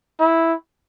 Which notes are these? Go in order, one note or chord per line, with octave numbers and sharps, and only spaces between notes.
E4